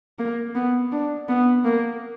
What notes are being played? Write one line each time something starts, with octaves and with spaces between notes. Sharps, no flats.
A#3
B3
D4
B3
A#3